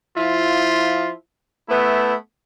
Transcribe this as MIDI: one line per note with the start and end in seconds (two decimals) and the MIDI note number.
0.16 1.12 53
0.16 1.12 64
0.16 1.12 65
1.69 2.15 57
1.69 2.15 59
1.69 2.15 64